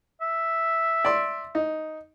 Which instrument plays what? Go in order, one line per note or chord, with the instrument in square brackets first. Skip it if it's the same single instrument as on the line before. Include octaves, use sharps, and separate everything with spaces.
[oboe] E5
[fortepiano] D5 C6
D#4